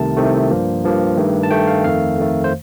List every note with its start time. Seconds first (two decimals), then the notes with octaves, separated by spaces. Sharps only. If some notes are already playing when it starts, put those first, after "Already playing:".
Already playing: C2 C3 D#3 A3 A5
0.17 C2 C3 D#3 A3
0.51 G2 F3 A#3
0.84 G2 F3 A#3
1.17 G2 D#3 A3
1.43 A5
1.51 G2 D#3 A3 G5
1.68 F5
1.84 F2 D#3 A3 F5
2.18 F2 D#3 A3
2.44 C5